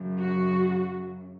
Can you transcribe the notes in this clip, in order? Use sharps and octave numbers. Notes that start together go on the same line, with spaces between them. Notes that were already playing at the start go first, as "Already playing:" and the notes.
Already playing: F#2 C#3 F#3
F#4